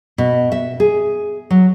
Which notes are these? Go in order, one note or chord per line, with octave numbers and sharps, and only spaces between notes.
B2
E5
G#4
F#3